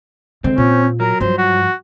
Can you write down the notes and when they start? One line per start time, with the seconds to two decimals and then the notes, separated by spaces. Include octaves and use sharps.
0.44 D3 G#3 C4
0.58 A#2 C#4
1.00 F#3 A#4
1.20 G2 F3 C5
1.38 F#4